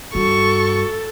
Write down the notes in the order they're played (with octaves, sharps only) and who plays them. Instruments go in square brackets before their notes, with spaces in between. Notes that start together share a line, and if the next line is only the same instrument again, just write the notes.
[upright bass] G2 [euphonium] F#4 [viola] A4 [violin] C#6